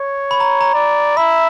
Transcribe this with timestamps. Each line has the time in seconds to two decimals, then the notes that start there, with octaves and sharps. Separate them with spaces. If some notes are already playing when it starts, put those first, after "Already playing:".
Already playing: C#5
0.31 B5
0.40 A#5
0.61 A#5
0.74 D5
1.17 E5 B5